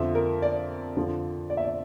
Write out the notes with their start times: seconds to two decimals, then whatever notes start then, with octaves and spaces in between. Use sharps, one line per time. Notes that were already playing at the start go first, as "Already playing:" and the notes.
Already playing: F2 D3 F3 E5
0.15 A#4
0.42 D5
0.96 F2 D3 F3
1.50 D5
1.57 E5
1.64 D5